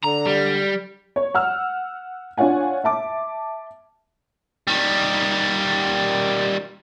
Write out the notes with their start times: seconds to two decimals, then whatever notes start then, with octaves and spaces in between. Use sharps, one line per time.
0.04 D3 A#5
0.27 G3
1.16 C#5
1.34 F#5 E6 F6
2.37 D4 F4 C#5 F#5 G#5
2.84 E5 A5 D6
4.67 D#3 G3